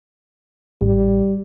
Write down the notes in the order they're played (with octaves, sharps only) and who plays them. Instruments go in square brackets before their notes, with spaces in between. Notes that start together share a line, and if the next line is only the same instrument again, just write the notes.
[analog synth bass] A1 [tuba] G3